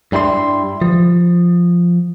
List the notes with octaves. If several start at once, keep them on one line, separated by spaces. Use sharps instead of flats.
G2 G3 E4 B4 C6
F3